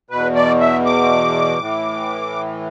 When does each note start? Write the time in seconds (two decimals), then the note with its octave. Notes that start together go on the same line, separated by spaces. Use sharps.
0.10 E2 B2 B4
0.35 D5
0.60 E5
0.86 D6
1.59 A2 E3